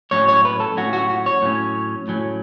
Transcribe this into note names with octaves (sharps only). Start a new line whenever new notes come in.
A2 F#3 C#4 C#5
C#5
B4
A4
A2 F#3 C#4 F#4
F#4
F#4
C#5
A2 F#3 C#4
A2 F#3 C#4